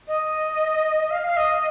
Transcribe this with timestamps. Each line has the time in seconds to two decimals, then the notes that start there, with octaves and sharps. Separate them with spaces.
0.07 D#5
1.10 F5
1.27 F5
1.37 D#5